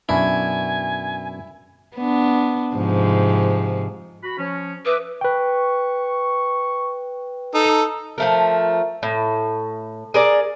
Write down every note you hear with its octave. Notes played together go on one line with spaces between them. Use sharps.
F#2 B2 D4 E4 G#5
B3 D4
G#2 C3 F3
F#4 B5
F3 C#4
B4 E5 D6 D#6
B4 G5 C#6
D#4 A4
F3 A3 A#4
A2
G#4 A#4 D5